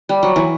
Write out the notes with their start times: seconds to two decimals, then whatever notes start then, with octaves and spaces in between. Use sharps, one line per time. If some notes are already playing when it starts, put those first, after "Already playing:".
0.09 G3
0.23 F#3
0.36 E3